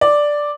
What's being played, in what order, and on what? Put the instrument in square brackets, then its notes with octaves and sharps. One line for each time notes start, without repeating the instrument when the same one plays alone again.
[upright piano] D5